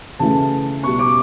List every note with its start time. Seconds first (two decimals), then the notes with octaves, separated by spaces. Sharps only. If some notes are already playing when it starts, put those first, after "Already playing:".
0.19 C#3 E3 A3 A5
0.83 B2 G3 C#6
0.99 D6